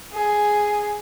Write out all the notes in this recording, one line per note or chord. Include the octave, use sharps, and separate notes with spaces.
G#4